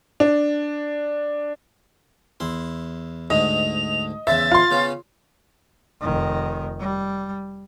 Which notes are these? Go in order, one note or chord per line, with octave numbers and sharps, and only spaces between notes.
D4
E2 E4 C6
D2 G#2 D3 D#5 F7
E2 C#3 C5 E5 A6
F4 C6
C#3 B3 C#4
F1 D#3
G3